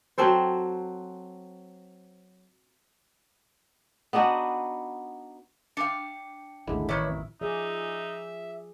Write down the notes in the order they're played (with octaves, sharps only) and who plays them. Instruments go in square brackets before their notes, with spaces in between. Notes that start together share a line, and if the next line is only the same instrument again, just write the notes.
[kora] F#3 C4 A4 C5
B3 D4 D#4 F#4
[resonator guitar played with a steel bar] D4 F5 [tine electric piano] G5 C#7
[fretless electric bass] A1 D#2 A2 [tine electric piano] D3 G#3 E4
[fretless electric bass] A1 [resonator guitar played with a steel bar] D#3 E4 [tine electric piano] B4 C#5 D5
[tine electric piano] F2
[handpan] F3 G#4 D5 [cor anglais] D#4 [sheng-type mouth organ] E5